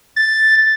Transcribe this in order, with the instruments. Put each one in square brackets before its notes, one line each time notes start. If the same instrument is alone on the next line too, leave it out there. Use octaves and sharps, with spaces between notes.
[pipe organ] A6